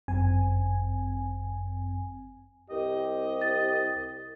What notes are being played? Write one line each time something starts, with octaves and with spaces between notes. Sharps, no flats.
G1 F#2 C4 G#5
C2 G4 D#5
A6